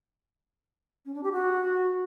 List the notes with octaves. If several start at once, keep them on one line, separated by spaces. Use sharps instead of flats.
C#4
D4
G4
F#4